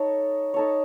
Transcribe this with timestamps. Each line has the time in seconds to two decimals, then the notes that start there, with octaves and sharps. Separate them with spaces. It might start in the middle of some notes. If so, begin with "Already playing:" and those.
Already playing: D#4 A4 C#5
0.54 D#4 A4 C#5